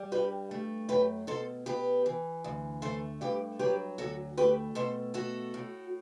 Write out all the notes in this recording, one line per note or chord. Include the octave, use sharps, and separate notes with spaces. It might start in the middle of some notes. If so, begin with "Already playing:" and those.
Already playing: G3
G2 G4 B4
A3
F#2 G4 B4
B2 A4 C5
B2 G4 B4
E3
D2
A3 A4 C5
G2 G4 B4
F#3 G4 B4
D2 F#4 A4
A3 G4 B4
B2 A4 C5
A3 F#4 A4
A2